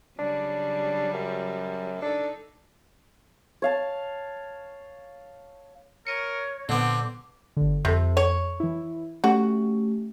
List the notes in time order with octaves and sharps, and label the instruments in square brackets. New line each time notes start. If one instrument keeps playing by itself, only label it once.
[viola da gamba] C#3 F#3 G3 [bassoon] D4
[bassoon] F#2
[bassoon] D4 [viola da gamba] D#4 A4
[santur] C#5 F5 A5
[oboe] A#4 [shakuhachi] C#5 [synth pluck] C#7 D#7
[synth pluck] A#2 [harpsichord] D3 B3 [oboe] C4 [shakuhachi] D6
[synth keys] G1 D3
[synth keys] F2 A4 [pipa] C3
[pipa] C#5
[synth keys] E3 E4
[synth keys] A3 C#4 G4 [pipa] F#4